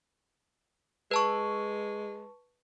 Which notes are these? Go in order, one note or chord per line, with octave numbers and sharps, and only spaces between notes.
G#3 B4 A5 C#6